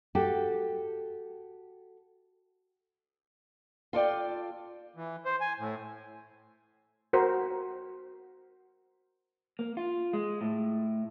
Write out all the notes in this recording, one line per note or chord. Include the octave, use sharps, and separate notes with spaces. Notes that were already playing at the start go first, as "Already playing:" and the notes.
F#4 G4 A4
F4 A4 D5 G5
E3
C5
G#5
A2
F#4 A#4 C5
A#3
F4
G#3
A2